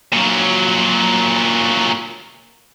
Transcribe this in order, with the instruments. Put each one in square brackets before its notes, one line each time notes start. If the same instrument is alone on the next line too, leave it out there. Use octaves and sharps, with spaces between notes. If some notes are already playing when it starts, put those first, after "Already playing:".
[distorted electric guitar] A#2 F#3